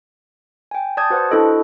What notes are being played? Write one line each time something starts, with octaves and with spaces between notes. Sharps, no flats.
G5 G#5
D5 A5 D#6 G6 G#6
F#4 B4 C5 F#5
D4 E4 F#4 A4 D#5